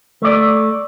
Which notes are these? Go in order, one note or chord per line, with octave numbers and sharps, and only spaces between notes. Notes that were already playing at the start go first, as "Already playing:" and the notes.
A3 D5